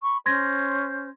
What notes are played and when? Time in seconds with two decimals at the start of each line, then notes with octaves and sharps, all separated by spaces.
0.04 B5 C#6
0.26 C#4 C5 C6 G#6 A#6